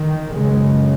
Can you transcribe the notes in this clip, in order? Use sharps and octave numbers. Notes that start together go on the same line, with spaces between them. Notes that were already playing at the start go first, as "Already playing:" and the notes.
Already playing: D#3
F#2 C#3 G#3